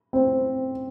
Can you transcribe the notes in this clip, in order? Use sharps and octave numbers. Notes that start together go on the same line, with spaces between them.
C4